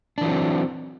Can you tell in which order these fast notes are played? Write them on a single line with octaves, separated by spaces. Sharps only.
D4 E3 F#3 C4